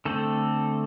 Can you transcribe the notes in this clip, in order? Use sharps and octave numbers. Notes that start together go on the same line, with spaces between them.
D3 A3 C4 A4